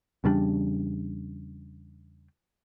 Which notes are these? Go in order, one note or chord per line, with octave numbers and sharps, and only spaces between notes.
E2 C#3 G3 D4